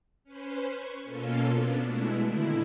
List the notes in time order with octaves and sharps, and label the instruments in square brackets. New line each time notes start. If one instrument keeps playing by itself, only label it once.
[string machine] C#4 B4 C5
C#6
B2 A#3 C#4 F4 A4
B3 D4
B2 G#3 A3 E4
A#2 D3 D#3 E4